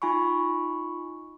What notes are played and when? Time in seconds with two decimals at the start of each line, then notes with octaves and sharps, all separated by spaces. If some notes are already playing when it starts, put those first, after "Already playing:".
0.02 D#4 F4 G#5 B5 C#6